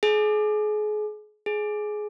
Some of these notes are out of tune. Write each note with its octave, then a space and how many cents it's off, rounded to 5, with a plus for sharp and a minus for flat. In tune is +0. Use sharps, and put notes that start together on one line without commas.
G#4 +35
G#4 +20